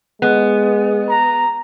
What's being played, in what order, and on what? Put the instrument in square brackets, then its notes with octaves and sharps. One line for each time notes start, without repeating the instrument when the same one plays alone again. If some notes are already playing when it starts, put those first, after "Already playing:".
[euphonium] G#3 [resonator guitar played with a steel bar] B3
[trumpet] A#5